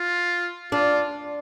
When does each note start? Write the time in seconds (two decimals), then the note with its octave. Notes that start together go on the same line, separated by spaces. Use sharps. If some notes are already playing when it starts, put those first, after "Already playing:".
Already playing: F4
0.72 D4 F4